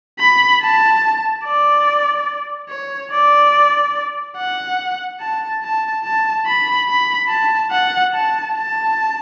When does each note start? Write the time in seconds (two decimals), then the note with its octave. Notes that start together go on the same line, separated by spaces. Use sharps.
0.19 B5
0.61 A5
1.44 D5
2.70 C#5
3.11 D5
4.37 F#5
5.20 A5
5.63 A5
6.04 A5
6.46 B5
6.88 B5
7.29 A5
7.71 F#5
8.13 A5
8.54 A5